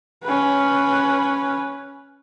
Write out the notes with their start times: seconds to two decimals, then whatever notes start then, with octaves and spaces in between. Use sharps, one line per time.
0.24 C#4 B4